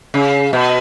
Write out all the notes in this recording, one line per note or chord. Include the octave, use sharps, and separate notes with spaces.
C#3
B2